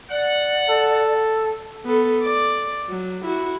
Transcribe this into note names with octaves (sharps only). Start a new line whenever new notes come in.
D5 F#5
A4
B3 A4
D5
F#3
E4 F#4